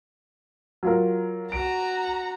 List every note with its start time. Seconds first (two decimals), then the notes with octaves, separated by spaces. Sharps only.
0.83 F#3 F4 A#4
1.52 F#4 A#5 D7